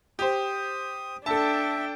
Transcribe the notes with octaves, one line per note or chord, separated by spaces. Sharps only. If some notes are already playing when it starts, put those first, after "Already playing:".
G4 C5 D#6
D4 A4 E5 G5 A5